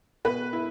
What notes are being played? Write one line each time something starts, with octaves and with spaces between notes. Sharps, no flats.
B2 B4
E4